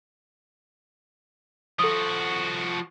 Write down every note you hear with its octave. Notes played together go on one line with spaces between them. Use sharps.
F3 F#4 A4 D#6